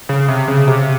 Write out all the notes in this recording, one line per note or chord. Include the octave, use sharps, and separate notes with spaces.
C#3
C3
C#3
C3